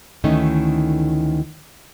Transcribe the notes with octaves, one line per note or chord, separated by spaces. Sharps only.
D2 D#3 E3 A3 C#4 D#4